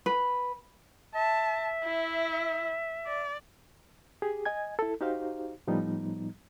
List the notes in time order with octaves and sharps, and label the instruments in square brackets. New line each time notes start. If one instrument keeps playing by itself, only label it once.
[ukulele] B4
[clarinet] E5 [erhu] A5
[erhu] E4
D5
[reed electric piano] G4 G#4
D#5 G#5 G#6
E4 A4
D#4 F#4 G4 C5 F5
A2 F3 G3 B3 D#4